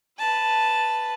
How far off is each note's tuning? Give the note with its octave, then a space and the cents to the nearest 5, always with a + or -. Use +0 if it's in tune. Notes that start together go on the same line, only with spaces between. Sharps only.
B4 +0 A5 +0